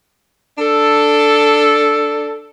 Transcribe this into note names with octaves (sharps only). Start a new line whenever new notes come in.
D4 A4